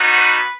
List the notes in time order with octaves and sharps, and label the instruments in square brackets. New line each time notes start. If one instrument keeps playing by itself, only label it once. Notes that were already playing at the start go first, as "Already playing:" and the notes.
Already playing: [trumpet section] G3 B3 D#4 F#4
B4